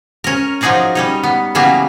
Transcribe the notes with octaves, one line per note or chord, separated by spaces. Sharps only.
C#4 A#4
F3 F#3 D#4 G#4 D5 A#5
G3 C#4 D#4
B3
C#3 E3 F#3 G3 A#3 B3